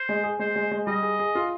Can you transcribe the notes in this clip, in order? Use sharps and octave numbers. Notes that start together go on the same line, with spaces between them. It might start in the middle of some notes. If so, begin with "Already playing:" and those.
Already playing: C5
G#3
G#4
G#3 C5
G#3
G#3
G3 D#5
G#4
G#4
F4